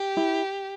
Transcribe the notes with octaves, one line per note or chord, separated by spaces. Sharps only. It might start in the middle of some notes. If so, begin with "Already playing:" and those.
Already playing: G4
E4